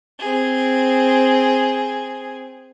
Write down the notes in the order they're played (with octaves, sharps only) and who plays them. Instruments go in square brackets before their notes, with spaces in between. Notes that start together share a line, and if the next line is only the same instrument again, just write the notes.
[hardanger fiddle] C4 G#4